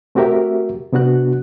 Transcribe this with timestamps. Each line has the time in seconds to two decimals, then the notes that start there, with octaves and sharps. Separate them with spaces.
0.15 A3 C4 F#4 G4 A#4 E5
0.93 C3 B3 D4 F#4 F#6